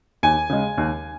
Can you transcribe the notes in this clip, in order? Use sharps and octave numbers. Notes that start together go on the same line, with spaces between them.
D#2 G#5
C#3 G#3
D#2